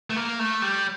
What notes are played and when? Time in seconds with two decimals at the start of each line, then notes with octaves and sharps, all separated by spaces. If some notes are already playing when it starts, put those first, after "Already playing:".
0.10 A3
0.16 A#3
0.39 A3
0.62 G3